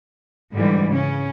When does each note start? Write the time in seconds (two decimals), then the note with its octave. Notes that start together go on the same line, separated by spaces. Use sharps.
0.54 G#2 D3 E3 G3
0.89 C#3 C#4